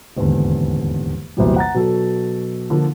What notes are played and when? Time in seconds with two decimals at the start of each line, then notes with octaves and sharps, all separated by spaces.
0.17 D#1 E2 G#2 D3
1.37 A#1 E2 C3 E3 F#3 G3
1.56 F#5 A#5 A6
1.74 B2 F#3 A4
2.70 D3 F3 A#3